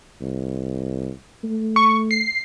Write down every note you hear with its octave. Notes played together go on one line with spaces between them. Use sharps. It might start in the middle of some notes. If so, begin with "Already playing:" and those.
C2
A3
C#6
C7